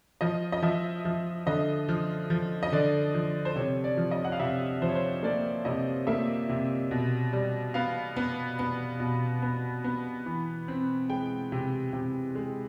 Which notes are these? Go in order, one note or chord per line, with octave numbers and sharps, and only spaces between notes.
F3 D#5
D#5
F3 E5
F3
D3 D#5
F3
F3
D#5
D3 D5
F3
C5
C3 C#5
D5
F3
D#5
F#5
F5
C3 E5
F3 C5
C#5
C5
A#3 D5
C3 D#5
A#3 E5
C3
B2
G3
B3 F5
B3
B3
B2
B3
B3
E3
C4
G#3 G5
C3
C3
G#3